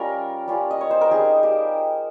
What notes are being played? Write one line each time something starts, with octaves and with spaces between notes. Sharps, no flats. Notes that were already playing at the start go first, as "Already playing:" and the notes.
Already playing: G3 C#4 F4 A#4
G3 C#4 F4
D#5
C#5
C5
A#4
G3 C4 D#4 G#4
G4